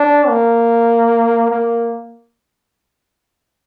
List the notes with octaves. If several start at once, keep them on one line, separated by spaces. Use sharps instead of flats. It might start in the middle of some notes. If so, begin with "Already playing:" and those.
Already playing: D4
A#3
A#3